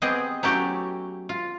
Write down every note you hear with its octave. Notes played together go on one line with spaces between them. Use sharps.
B3 C4 G4 G#4 D#5
F#3 A3 C#4 E4 F#4 G4
F4